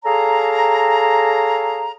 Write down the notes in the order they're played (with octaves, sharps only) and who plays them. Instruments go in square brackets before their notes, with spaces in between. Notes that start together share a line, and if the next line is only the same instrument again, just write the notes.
[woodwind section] G#4 A4 C#5 F5 A#5